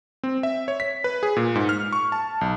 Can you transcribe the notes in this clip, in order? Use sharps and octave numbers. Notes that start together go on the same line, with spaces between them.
C4
E5
C#5
B6
B4
G#4
A#2
G#2
F6
C#6
A5
B1